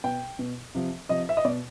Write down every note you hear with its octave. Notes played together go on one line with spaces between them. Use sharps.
B2 G5
B2
C3 F3
C3 F3 D#5
E5
D#5
B2 D5